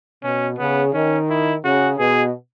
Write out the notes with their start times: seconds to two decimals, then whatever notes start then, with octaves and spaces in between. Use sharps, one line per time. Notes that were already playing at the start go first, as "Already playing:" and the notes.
0.24 B2 C#4
0.59 C#3 B3
0.94 D#3 C#4
1.30 E4
1.64 C#3 F#4
1.99 B2 G#4